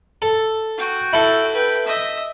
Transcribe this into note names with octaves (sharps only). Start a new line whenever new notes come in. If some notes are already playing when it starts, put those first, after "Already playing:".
A4
F#4 G5
E4 A4
B4 G5
D#5 E5